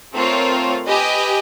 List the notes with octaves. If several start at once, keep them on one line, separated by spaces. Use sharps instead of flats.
A3 C4 F4 A#4 C#5
G4 B4 D#5 G#5